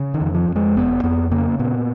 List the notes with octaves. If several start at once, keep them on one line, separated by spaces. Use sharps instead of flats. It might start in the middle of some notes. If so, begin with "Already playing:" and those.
Already playing: C#3
D#3
F2
F3
F2
G#3
F#1 B3
F2 B3
C#3 A#3
A#2 B3